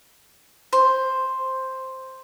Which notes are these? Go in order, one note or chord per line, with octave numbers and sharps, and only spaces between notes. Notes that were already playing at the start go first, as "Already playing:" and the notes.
C5